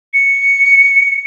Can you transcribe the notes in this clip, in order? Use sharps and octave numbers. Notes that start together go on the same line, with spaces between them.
C#7